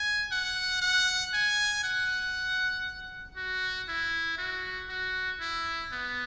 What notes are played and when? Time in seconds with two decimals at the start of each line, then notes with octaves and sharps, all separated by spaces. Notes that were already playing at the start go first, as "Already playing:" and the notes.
Already playing: G#5
0.31 F#5
0.82 F#5
1.33 G#5
1.84 F#5
3.36 F#4
3.88 E4
4.38 F#4
4.89 F#4
5.40 E4
5.92 B3